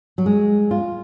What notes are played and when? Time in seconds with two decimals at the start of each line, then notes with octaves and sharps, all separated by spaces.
0.18 F#3
0.26 G#3
0.71 F4